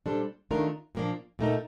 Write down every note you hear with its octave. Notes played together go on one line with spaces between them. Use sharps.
A#2 G3 D4 A4 C5
D#3 A3 D4 F4 A#4
A#2 F3 A#3 D4
A#2 A3 D#4 A#4